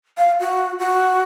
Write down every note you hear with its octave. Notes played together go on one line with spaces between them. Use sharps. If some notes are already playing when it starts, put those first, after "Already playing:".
F5
F#4
F#4